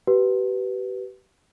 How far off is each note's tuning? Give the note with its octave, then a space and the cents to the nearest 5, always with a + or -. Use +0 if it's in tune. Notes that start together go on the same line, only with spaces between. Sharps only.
G4 -35 B4 -5